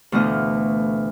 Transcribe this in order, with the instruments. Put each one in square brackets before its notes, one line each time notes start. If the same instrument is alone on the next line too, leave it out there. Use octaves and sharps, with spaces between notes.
[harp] D2 B2 E3 A3 D#5 F5